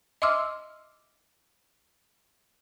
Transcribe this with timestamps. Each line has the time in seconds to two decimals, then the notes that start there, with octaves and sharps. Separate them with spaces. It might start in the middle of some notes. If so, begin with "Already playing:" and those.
0.22 D#5 E5 C6 D6 E6 F6